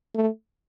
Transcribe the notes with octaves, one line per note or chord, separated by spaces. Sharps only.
A3